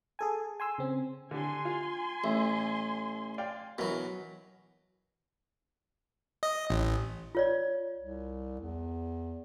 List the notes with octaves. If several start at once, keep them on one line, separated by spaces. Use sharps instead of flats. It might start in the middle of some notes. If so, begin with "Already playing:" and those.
G#4 A4 G#5
G#5 C6 E6
C#3 C4
D3 G4 G#5 C6
F4
A1 E5
D5 F5 G5
B2 E3 F#3 A#4
D#5
A1
F4 C#5 D5
C2
E2